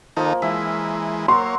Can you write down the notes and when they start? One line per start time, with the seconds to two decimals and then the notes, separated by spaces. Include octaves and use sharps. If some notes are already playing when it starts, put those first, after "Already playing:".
0.17 D#3 F3 A#3 D#4 A4
0.42 E3 G#3 E5
1.28 F#3 A#3 C#5 C6